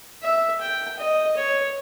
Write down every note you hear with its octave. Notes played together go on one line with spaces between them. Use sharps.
E5
G5
D#5
C#5